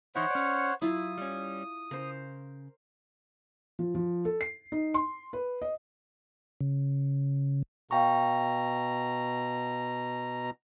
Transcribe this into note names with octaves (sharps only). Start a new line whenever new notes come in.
E3 D#4 E4 C5 C#5 F#5
C#4 D5
F#3 E4 F4 D#6
G3 C#4
C#3 A#4 C5
F3
F3
A4
C7
D#4
C6
B4
D#5
C#3
B2 F5 G5 A#5 C#6